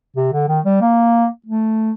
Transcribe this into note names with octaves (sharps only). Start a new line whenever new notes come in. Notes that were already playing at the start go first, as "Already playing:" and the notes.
C3
D3
D#3
G3
A#3
A3